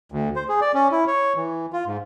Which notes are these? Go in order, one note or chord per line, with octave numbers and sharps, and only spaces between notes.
D2
C5
G#4
D5
C#4
E4
C#5
E3
F4
G#2